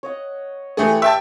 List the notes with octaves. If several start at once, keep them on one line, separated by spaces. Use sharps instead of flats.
C#5 D#5 F#5
E3 A3 G4 G#4
E5 G5 A5